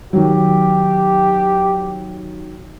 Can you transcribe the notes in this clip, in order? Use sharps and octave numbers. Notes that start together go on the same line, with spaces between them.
D#3 F#3 G4